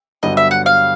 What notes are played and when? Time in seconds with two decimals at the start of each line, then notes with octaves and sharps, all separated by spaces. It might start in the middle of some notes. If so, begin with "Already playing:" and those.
0.23 G2 D3 F#3 B3 D#5
0.37 E5
0.51 F#5
0.66 F5